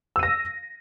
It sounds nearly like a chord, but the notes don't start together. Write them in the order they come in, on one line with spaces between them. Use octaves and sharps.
E6 D#7 A#6